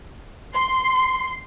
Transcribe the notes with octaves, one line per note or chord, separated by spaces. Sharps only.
C6